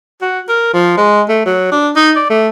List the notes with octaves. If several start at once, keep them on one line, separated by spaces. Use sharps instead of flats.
F#4
A#4
F3
G#3
A3
F#3
D4
D#4
D5
A3